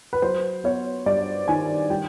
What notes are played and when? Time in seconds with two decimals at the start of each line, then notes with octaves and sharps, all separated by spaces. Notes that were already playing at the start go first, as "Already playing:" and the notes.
0.13 B4
0.22 F#3 C5
0.64 B3 C#5
1.06 G2 D5
1.48 D#3 G#5
1.90 G3 G5